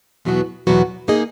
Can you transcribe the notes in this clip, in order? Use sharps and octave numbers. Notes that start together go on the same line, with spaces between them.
E2 B2 F#3 B3 F#4
E2 B2 F#3 B3 F#4
A#3 D#4 G#4 D#5